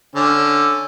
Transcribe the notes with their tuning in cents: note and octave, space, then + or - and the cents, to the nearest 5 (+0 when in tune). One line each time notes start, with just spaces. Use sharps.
D3 +0 C#4 +0